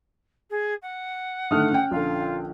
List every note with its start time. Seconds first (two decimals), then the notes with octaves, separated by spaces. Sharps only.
0.50 G#4
0.82 F#5
1.51 D3 D#3 A3 D#6 F6 F#6
1.71 C#4 G5
1.91 A#1 D3 F4